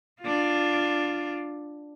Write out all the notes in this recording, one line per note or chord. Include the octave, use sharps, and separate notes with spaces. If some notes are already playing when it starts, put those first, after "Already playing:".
D4 F4